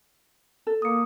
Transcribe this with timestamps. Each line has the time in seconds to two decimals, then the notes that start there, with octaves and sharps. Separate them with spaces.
0.67 A4
0.82 A#3 D#6 C#7